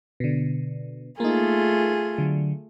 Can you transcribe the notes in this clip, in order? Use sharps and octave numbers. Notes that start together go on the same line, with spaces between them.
B2 D3
A3 A#3 D#4 F4 G#4
D3 F#3